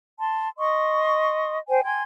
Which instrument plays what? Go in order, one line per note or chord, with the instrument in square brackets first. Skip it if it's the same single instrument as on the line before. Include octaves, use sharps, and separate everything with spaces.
[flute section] A5 C6
D#5 C6 C#6 D#6
C5 G5 G#5
G5 G#5 C6 G#6